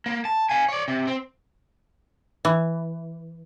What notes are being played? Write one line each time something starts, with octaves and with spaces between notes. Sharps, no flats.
A#3
A5
F5 G#5
C#5 D5
C3
C4
E3